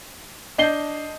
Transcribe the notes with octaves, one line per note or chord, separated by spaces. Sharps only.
D4 D#5 A5 G6 C7 G7